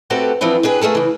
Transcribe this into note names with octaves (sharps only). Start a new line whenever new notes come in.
A3 C4 F#4 G4 A4 B4
E3 F3 B3 C4 D4
D4 G4 G#4 B4
A3 A#3 G#4 A4
C#3 E3